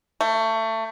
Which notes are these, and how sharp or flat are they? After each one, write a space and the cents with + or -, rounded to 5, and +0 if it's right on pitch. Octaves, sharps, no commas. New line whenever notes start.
A3 +25